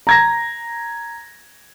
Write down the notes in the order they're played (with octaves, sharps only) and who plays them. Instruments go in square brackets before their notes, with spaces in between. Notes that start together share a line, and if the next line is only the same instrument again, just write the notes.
[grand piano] A#5 G#6 A#6